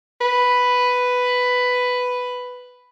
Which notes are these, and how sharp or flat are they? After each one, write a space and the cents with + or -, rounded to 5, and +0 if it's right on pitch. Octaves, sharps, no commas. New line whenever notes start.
B4 +5